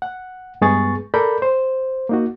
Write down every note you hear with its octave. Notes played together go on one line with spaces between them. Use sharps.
F#5
G2 G#3 B3 G#4 C#6 A6
A4 A#4 D5 B5 G6
C5
A#3 D#4 F#4